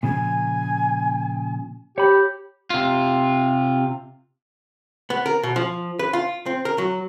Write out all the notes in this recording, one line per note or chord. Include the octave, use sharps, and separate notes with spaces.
A#2 C#3 F3 G#5
G4 C#5 B5
C3 F4
B3
A#4
B2
F3
B4
F4
C4
A#4
F#3